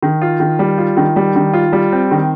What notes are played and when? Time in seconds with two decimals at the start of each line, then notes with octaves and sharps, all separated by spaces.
0.03 D#3
0.22 F4
0.40 D#3
0.59 G3
0.78 F4
0.97 D#3
1.16 G3
1.35 D#3
1.53 F4
1.73 G3
1.92 C4
2.11 D#3